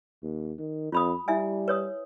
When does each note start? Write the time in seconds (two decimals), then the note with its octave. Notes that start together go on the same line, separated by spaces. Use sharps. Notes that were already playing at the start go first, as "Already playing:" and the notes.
0.23 D#2
0.59 D#3
0.92 F2 F4 B5 D#6
1.28 G3 E4 E5 G#5
1.68 B4 C#5 D#6